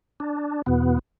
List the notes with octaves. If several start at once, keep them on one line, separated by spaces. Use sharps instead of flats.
D4
E2 B2 B3